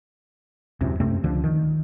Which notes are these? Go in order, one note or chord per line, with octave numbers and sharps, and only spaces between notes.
D#1 C2 F#2 C3
F#2 C3 A3 C4
C#2 D3 F3
D#3